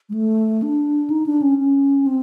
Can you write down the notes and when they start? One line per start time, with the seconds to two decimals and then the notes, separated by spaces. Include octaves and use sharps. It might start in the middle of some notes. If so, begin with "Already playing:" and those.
0.09 G#3
0.14 A3
0.62 D4
1.10 D#4
1.26 D4
1.42 C#4
1.59 C#4
2.07 C4